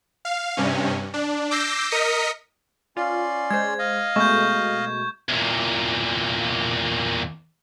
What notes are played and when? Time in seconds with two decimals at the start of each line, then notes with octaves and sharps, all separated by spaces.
0.25 F5
0.57 G2 C3 C#4
1.14 D4
1.51 D6 E6 G6 A#6 C7
1.91 A#4 D#5 D#6 B6 C#7
2.97 C#4 F4 D5 C6
3.51 G#3 C5 G#6
3.79 D#5 F5
4.16 B2 G#3 A3 C#6 G6
5.28 E2 A#2